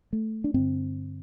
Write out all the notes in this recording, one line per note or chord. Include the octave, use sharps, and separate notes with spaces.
A3
D4
G2 D3 C4